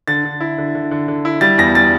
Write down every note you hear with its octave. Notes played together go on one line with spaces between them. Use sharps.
D3 A6
D3
E4
D3
D3
D3
D3
E4
G3 A6
E2 A#6
G3 A6